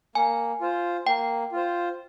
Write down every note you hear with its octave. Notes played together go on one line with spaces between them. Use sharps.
A#3 G#5
F4 C5
A#3 G5
F4 C5